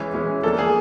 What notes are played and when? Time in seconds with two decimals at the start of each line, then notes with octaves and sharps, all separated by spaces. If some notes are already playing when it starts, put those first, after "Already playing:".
Already playing: E3 G#3 C#4
0.14 E3 G#3 C#4
0.43 F3 A#3 D4 A4
0.59 G#4